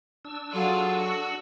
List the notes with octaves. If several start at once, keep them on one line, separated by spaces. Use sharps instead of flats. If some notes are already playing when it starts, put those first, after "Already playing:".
D4 E6
F#3 F4 G#4 A4 D5
F#4